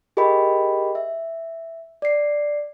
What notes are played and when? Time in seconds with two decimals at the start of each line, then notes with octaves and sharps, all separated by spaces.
0.17 G4 G#4 A#4 D#5 G5 B5
0.95 E5
2.02 D5 C7